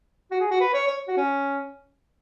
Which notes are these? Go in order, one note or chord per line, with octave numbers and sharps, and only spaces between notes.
F#4
G#4
F#4
B4
C#5
C#5
F#4
C#4